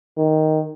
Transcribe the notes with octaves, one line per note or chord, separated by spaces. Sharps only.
D#3